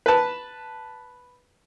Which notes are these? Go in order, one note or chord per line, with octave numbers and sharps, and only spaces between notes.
B4 A5